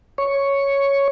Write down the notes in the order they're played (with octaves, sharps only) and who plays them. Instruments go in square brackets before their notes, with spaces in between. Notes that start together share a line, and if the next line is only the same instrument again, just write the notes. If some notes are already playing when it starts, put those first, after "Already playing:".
[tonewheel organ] C#5 C#6